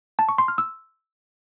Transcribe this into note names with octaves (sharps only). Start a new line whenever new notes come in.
A5
C#6
C6
F6
E6